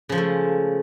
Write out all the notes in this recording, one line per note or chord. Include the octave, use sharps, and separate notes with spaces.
C#3 F3 G#3 A3